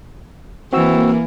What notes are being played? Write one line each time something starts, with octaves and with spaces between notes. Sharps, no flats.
E3 A#3 C4 F#4 E6